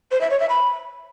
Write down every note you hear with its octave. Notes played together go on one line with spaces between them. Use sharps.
C5
E5
C#5
E5
B5